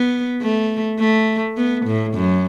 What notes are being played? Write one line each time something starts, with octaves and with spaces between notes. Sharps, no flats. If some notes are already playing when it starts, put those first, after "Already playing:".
Already playing: B3
A3
A3
B3
A2
F#2